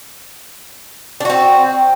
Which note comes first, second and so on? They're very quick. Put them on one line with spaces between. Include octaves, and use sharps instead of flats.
D4 F#4 C4